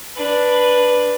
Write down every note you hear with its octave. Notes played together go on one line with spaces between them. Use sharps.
D4 B4